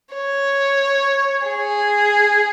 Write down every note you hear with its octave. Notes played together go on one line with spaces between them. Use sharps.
C#5
G#4